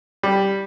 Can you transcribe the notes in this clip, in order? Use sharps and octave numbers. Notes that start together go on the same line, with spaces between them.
G3